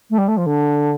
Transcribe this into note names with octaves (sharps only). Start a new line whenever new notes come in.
A3
G3
A3
F3
D3